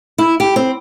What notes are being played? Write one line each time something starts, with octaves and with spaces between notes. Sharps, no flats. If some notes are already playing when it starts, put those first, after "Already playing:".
E4
G4
C4